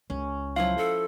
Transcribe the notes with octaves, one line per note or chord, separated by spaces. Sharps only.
C#2 C#4
F3 F#3 E4 F4 F5
A4